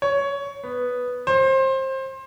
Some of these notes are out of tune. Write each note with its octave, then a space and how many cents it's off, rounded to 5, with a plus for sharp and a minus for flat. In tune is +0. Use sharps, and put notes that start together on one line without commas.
C#5 +10
B3 +0
C5 +25